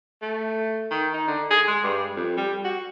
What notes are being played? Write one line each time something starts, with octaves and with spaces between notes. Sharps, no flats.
A3
D#3
D#4
D3
G#4
G#3
G2
F2
G3
F#4